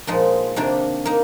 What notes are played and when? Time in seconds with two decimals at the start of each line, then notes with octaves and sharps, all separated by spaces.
0.07 A#2 F3 G#3 D#4
0.56 C3 D#3 A#3 D4
1.05 A#3 D#4